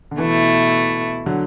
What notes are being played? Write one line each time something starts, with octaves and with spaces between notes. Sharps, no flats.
D3
B2 E3 A3 E4
D3 F#3